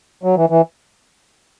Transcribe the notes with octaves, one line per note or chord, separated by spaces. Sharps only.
F#3
E3
E3